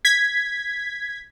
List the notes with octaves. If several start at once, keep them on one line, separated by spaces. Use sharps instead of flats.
G#6 B6